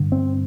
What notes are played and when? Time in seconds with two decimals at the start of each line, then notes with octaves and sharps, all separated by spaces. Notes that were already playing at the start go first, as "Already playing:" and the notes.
Already playing: G2 D3
0.12 C4